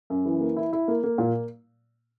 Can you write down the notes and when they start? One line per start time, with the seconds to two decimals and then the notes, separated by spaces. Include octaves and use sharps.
0.10 F#2
0.26 E3
0.41 A#3
0.57 E4
0.73 E4
0.88 A#3
1.04 A#3
1.18 A#2